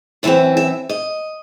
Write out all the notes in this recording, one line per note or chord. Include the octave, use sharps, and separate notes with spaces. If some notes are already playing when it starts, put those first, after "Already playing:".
F#2 E3 C4 E5
E5
D#5